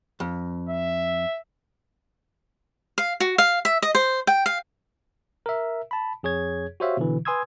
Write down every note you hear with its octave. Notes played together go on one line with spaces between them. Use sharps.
F2
E5
F5
F#4
F5
E5
D#5
C5
G5
F5
A#4 E5
A5 B5
F2 G#4 C#5 G#6
F#4 G4 C5 C#5 E5 F5
B2 D3 E3
B4 G#5 C6 D#6 E6 G#6